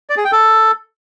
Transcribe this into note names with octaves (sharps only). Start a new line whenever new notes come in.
D5
G#4
G5
A4